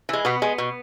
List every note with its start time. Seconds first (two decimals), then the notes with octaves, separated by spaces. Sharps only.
0.09 E3 G#3
0.25 B2 B3
0.42 G#3
0.58 B2